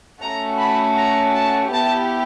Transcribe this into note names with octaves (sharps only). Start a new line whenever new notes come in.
A3 C#4 F#4 A#5
B5
A#5
A5
B3 E4 G4 A5